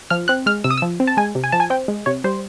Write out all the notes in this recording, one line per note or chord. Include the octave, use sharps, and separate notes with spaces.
F3 F6
C4 F#6
G#3 F6
C3 E6
D#6
E6
F3
C4
A5
G#3 G#5
C3
G#5
F3 A5
G#5
C4 G5
G#3
C3 C#5
G3 C5